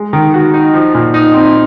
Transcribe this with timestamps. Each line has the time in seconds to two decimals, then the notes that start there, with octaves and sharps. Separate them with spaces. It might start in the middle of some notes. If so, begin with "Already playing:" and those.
Already playing: G#3
0.13 D#3
0.34 F#4
0.54 D#4
0.74 F3
0.94 A#2
1.14 D#4
1.34 C4